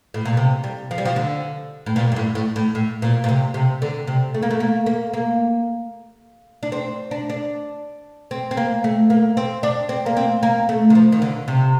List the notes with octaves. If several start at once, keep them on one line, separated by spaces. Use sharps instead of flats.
A2
A#2
C3
G3
F3
G3
F3
D3
A2
A#2
G2
A2
A2
A2
A2
A#2
A#2
C3
C3
D3
C3
A3
A#3
A3
A#3
A#3
A#3
D4
C4
D4
D4
C4
C4
A#3
A3
A#3
C4
D4
C4
A#3
C4
A#3
A3
D#3
F3
D#3
D3
C3